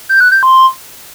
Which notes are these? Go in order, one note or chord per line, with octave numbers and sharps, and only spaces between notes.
G6
F#6
G6
C6